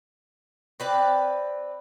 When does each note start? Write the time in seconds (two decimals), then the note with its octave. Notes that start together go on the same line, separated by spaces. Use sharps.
0.80 C4 B4 D5